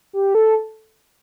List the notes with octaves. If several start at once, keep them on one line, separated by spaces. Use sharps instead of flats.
G4
A4